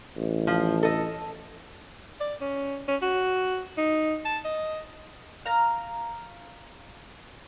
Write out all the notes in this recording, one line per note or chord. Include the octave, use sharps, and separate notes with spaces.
A1
F3
A4 D#5
D5
C#4
C#4
F#4
D#4
A5
D#5
F5 A#5